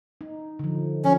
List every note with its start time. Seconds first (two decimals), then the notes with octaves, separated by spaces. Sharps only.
0.21 D#4
0.59 D3 F3
1.04 F3 C#4